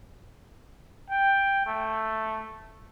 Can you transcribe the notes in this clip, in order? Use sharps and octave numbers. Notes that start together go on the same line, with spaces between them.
G5
A3